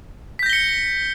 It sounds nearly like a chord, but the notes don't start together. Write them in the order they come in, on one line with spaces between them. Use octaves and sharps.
B6 G6 A#6 G7 C#7